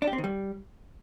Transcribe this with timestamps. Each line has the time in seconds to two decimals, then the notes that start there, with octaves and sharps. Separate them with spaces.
0.02 D4
0.07 G4
0.13 C4
0.18 D#3
0.24 G3